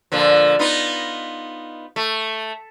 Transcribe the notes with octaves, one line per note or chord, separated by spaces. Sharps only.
A#2 D3 F3
B3 D#4 F4
A3